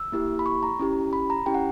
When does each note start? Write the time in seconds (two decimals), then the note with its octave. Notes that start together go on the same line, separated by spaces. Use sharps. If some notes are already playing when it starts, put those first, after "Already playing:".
Already playing: E6
0.12 A#3 E4 G4
0.39 B5
0.46 C#6
0.63 A#5
0.79 C#4 E4 G4
1.13 B5
1.30 A#5
1.46 C#4 E4 G4 G5
1.54 F#5